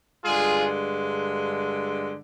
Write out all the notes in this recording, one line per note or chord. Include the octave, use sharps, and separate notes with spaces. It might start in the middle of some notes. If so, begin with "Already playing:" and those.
G2 D3 G#3 F4 G#4